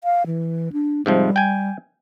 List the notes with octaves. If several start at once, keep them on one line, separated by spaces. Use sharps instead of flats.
F5
E3
D4
G#2 C3 F3 G3
G5 G#5